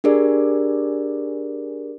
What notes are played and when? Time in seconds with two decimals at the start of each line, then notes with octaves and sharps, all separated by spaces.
0.04 D4 G4 G#4 A#4 D5